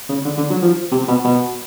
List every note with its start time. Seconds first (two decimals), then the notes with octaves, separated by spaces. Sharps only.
0.09 C#3
0.25 D3
0.38 D3
0.50 F#3
0.63 F3
0.92 C3
1.08 B2
1.24 B2